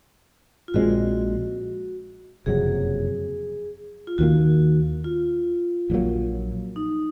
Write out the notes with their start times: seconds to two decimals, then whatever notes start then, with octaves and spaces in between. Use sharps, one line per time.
0.68 F4
0.74 A#1 A#2 G#3 C4 F#4
2.46 F#1 F2 C3 F#3 G#4
4.07 F4
4.18 D#2 D#3 A#3 F#4
5.04 F4
5.90 A#1 G#2
5.94 F#3 A#3
6.76 D#4